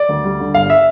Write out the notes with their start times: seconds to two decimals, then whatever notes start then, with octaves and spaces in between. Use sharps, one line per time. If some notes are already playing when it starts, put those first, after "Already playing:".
Already playing: D5
0.09 D2
0.24 G3
0.40 D3
0.54 G1 F5
0.70 E5